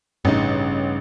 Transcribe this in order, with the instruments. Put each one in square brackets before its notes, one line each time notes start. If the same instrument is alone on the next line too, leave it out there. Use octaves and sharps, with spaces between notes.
[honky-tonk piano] A1 D#4 [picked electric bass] G2 C#3